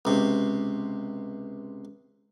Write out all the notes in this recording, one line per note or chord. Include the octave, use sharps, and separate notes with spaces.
C#2 C3